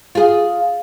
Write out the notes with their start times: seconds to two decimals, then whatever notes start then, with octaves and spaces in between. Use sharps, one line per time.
0.15 F4 G#4